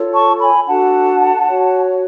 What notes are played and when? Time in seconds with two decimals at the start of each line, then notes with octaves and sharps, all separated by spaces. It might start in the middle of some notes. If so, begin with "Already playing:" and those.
Already playing: F4 A4 C#5
0.13 A5 C#6
0.41 G#5 B5
0.67 D4 F#4 A4 F#5 A5
1.48 F#4 C#5